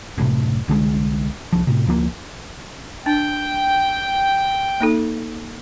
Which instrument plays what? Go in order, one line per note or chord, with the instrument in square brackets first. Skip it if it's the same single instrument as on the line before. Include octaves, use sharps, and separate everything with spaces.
[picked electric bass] F#1 A2 C3
C2 D3 E3 G#3
C2 F3
A2 C3
D2 F3 G#3 A#3
[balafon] D4 [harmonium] G5
[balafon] A#3 D#4 A4